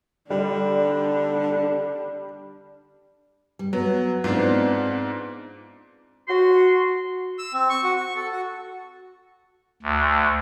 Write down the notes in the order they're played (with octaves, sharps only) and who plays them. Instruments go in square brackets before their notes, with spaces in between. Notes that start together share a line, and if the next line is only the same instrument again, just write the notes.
[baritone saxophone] D3 [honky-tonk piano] G3 [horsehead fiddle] D4
[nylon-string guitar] G3
[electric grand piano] F#3 [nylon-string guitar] B3
[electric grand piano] G#2 D4 [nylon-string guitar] B3 C4 F4
[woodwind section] F#4 C6
[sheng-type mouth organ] E6
C4
C#6
F#4
C#6
A4
F#4
[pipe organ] D2